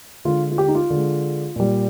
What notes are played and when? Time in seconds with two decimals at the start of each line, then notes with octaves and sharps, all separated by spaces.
0.25 D3 G#3 F4
0.52 F4
0.58 G4
0.68 D#4
0.75 F4
0.90 D3
0.96 G#3
1.56 A#2 G3